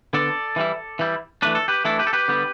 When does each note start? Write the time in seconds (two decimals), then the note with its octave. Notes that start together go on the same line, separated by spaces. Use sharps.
0.13 D3 B3 D4 A4 D5
0.56 E3 G3 E4
0.99 E3 G3 E4
1.42 E3 A3 D4 B4
1.55 A4
1.68 G4 B4
1.85 E3 A3 D4 E4 A4
1.99 G4 B4
2.07 A4
2.13 G4 B4
2.28 D3 G3 B3